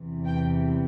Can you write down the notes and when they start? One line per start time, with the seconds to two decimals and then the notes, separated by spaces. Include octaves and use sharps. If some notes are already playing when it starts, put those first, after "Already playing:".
Already playing: E2 C3 E3
0.27 G5